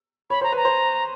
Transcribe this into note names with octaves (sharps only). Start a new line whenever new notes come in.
C#5 B5
C5 A#5
B4 A#5
C5